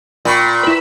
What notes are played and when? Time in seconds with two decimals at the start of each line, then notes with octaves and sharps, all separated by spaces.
0.25 A#2 G5 B5 C#6
0.63 E4 B4